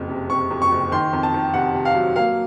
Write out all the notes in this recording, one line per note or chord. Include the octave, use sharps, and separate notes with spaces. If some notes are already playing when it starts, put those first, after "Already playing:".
Already playing: F#1 F2
C3
C3 C#6
F2
C#6
F#1
D#3 C6
F2
A5
D#3
C3 F#5
C3
F5
F#3
A#3 F5